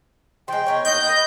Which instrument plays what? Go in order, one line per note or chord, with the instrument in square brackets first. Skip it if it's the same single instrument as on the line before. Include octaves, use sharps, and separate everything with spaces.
[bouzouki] F3 G#3 [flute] G5
[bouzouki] B3 A#4 C#5
[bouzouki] A#3 D#4 F#5 [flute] D#5 [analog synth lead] G6
[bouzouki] B4